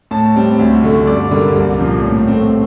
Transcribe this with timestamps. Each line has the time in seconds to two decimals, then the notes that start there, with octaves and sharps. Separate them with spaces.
0.11 A2 A5
0.36 G3 C4
0.59 D2
0.84 D3 A3
1.07 G2 D5
1.31 D3 G3 A#3
1.56 C2
1.79 A#2 F3
2.04 A2
2.27 A3 C4